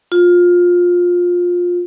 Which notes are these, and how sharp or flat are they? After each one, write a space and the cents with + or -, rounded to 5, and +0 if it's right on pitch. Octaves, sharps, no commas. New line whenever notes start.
F4 +20